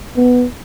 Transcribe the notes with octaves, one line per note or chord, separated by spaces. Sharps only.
B3